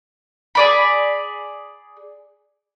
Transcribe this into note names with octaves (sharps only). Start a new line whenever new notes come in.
G#4 D5 B5